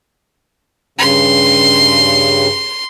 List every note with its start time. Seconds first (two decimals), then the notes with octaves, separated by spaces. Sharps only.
0.99 G2 C#3 C6